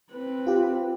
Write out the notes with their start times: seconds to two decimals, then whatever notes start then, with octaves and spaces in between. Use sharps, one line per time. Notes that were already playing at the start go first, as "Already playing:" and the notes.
0.12 C4 B4
0.47 F4 G4